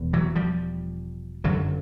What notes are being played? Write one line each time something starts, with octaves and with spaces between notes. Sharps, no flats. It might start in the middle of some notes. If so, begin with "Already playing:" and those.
Already playing: E1 E2
E3 F#3
F3 G3
G1 F#2 D3 F#3